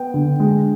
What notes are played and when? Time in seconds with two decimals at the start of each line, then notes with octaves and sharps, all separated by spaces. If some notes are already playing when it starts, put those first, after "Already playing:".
Already playing: B3 G5
0.14 D3
0.40 G#3